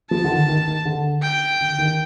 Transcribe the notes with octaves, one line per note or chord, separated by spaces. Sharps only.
F3 A5
D3
D#3
D#3
D#3
D3
G5
D3
D#3